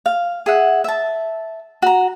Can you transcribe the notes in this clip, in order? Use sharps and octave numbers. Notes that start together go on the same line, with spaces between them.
F5
G#4 E5 F#5
E5 A5
F#4 A#5